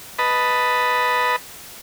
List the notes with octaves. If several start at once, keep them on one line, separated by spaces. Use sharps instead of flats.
B4 D#5 A5 B5